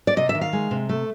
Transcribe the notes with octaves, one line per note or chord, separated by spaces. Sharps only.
D5
C3 D#5
E5
D#3
F5
G#3
C3
A3